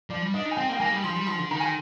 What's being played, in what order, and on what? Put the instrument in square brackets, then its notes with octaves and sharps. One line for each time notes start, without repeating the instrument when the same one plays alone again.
[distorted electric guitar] F3 [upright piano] D5
[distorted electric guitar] G3
[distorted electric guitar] D4 [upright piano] D#5
[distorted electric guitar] D#4
[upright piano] G#5
[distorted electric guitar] C4 [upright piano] G5
[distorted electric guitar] A#3
[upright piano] G5
[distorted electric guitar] A#3 [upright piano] G#5
[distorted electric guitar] G3
[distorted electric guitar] F3 [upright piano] C6
[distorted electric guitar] G3
[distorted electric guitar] F3 [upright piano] C6
[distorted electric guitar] D3
[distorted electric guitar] D#3 [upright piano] A#5
[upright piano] G#5